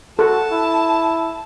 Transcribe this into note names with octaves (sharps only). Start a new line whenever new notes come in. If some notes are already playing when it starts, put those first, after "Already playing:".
F#4 A4 A5
E4